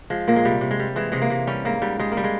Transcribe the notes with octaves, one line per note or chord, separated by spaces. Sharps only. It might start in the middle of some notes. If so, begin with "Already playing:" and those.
F3 G#3
A#2 A#3
G#3
C3 G3
C3
G#3
G3
E3 G#3
C3 G#3
A#3
C3
G3 C#4
G#2 A#3
G#2 G3
G3 G#3
A#3
G3
G#3